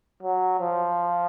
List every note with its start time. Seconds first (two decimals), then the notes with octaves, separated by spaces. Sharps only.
0.23 F#3
0.59 F3